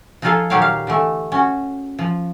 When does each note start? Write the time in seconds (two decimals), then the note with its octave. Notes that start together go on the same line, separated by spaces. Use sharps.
0.22 F3 D#4 F4 G#4 A4 F5
0.50 A#2 D#3 F#3 G4 C#5 F5
0.62 F5
0.87 D3 E3 A3
1.32 C#4 F#4
1.99 F3